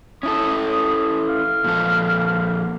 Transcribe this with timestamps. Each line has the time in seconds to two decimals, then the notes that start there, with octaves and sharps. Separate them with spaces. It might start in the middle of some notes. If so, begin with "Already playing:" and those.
0.23 C#4 E4 A4 D#6
1.29 F5
1.64 A#2 F3 A4